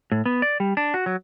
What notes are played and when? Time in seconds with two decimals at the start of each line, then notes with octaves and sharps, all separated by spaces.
0.12 A2
0.26 B3
0.42 D5
0.60 G3
0.77 D4
0.94 F#4
1.06 F#3